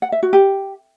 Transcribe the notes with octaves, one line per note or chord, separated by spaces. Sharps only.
F#5
E5
F#4
G4